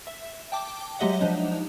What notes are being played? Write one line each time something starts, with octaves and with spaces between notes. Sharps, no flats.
E5
G5 A5 D6
F#3 G#3 G4 D#5 E5 F#5
F3 D4 D#4